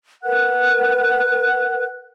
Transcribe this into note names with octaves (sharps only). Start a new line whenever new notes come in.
A#4 B4 F#5 F#6